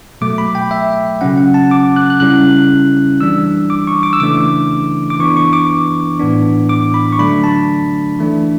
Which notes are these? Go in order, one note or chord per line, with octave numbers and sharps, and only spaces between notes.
B2 F#3 A3 D6
B5
G5
E5
C#3 F#3 C#4 F#5
F#5
A5
D6
F#6
F#6
C#3 G3 C#4 E4 F#6
E3 G3 D4 E6
D6
C#6
D6
E6
C#3 E3 A3 D4 D6
D6
E3 B3 D4 C#6
C#6
D6
A2 E3 B3 D4
D6
B5
C#6
D3 F#3 A3 D4 B5
A5
E3 A3 D4